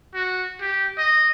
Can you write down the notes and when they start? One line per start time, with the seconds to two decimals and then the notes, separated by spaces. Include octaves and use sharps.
0.14 F#4
0.61 G4
0.98 D#5